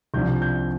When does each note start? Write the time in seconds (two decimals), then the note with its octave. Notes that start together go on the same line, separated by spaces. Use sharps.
0.14 C2 C3 F3 D4 G6
0.42 G6